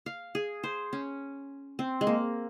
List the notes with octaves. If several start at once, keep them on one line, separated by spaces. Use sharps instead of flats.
F5
G#4
C5
C#4
C4
G#3
A#3